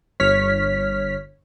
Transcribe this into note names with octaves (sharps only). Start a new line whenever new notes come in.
G1 C#5 F6 B6